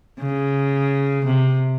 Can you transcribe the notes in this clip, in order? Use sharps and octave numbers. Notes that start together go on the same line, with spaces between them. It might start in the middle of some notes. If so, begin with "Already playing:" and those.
C#3
C3